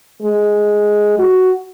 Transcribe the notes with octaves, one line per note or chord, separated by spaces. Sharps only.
G#3
F#4